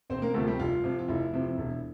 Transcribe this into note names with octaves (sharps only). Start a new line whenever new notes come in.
E1 C4 C5
A#3 A#4
D2 C3 F3 A3 A4
G3 G4
F1 F4
F2 C3 F3
F4
F1 E4
F2 C3 F3
E1